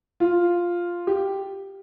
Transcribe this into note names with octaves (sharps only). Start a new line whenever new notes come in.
F4
G4